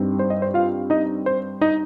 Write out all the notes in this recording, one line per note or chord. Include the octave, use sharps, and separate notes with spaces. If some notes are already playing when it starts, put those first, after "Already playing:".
Already playing: G2 G3 C4 D#4
C5
D#5
C5
F4 F5
D#4 D#5
C5
D#4 D#5